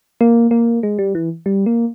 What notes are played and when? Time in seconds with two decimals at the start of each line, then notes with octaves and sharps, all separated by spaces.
0.21 A#3
0.51 A#3
0.83 G#3
0.99 G3
1.15 E3
1.46 G3
1.66 A#3